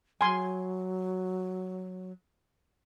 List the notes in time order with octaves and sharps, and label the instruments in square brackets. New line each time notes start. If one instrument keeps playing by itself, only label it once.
[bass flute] F#3 [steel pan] G#5 C6